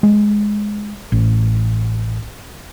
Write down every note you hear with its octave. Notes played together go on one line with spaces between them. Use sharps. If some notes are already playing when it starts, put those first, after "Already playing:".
G#3
A1